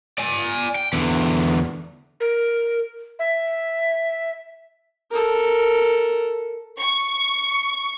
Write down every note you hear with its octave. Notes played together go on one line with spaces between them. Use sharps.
D5 G#5
G5
E2 D3
A#4
E5
A4 A#4
C#6